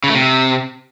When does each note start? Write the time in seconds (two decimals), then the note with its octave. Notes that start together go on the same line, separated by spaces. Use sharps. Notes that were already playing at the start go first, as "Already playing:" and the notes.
0.04 C#3
0.09 A3
0.15 C3